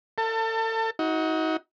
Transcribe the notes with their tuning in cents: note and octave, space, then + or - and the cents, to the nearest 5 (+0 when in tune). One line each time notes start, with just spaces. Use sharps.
A4 +35 A5 +25
D#4 +35 F#4 +0